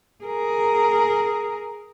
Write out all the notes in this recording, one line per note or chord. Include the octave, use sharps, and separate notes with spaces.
G#4 A#4